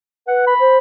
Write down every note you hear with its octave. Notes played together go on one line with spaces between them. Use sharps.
B4 F#5
B5
C5